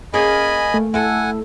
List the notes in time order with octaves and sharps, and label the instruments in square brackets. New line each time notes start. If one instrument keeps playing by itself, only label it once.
[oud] A#3 C#4 G#4 [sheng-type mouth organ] D#5 G#5 B5
[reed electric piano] A3
[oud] E4 A4 [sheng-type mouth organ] F#5 G#5